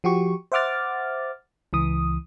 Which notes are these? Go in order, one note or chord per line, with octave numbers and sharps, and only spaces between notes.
F3 F#4 G4 C#6
C5 E5 F#5 D6 F6 A6
C#2 E3 D#6